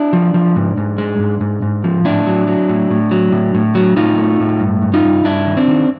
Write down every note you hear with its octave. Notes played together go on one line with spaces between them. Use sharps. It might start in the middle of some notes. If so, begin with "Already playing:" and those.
Already playing: D4 E4
F3
F3
G#2
G#2
G#3
G#2
G#2
G#2
F3
A2 D4 E4
F#3
F#3
A2
A2
F#3
A2
A2
F#3
A2 D#4 F4
A3
A2
G2
G2
D#4 F4
G2
G2 D4 E4
D#3
C4 D4
D#3